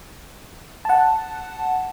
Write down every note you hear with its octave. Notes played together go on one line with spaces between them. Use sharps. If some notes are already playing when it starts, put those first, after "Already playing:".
F#5 A5